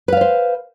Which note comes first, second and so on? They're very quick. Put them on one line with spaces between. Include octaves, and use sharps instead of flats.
B4 F5 D5 C5